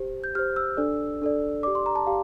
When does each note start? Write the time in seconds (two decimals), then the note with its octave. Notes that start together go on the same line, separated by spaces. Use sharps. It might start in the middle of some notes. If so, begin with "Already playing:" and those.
Already playing: G4 C5
0.24 G6
0.35 G4 C5 F6
0.56 E6
0.77 D4 A4 D5
1.21 D4 A4 D5
1.63 G4 D5 D6
1.75 C6
1.86 A#5
1.96 A5
2.07 G4 F5